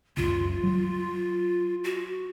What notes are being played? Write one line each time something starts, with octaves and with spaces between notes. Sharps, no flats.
F#1 C#2 F4
F#3
F#4